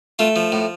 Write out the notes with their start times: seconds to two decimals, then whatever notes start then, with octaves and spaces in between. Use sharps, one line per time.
0.19 A3 F4
0.36 F3
0.52 A2